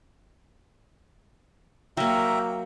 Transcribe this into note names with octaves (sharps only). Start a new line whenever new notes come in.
F#3 A#3 E5 G5 A#5